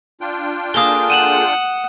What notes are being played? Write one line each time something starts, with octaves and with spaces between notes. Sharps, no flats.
D4 F4 G5
A#3 G#4 A4 D#6 G7
F#5 D#7 E7 F#7